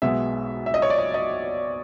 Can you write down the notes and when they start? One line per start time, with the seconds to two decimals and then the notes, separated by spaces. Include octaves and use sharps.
0.02 B1 B2 G#3 B3 E5
0.66 E5
0.74 D#5
0.82 C#5
0.90 D5
0.98 D#5
1.14 D#5